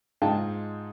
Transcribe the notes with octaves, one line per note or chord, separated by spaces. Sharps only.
G#2 D#4 F4 G#4 G5 A5